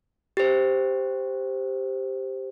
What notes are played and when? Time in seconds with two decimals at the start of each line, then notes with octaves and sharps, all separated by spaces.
0.37 G4 C5